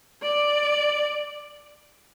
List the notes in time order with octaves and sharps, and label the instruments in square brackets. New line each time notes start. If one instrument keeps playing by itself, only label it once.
[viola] D5